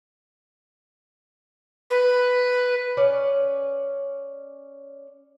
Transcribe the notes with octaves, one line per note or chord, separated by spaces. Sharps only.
B4
C#4 D5